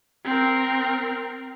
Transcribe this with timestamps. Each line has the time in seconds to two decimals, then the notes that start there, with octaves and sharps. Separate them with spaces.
0.25 C4 A#4